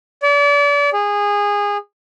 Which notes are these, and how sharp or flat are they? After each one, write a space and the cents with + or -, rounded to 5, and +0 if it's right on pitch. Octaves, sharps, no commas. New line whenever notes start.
D5 -35
G#4 -20